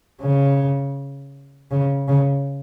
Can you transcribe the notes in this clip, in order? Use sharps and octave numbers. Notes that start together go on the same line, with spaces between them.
C#3
C#3
C#3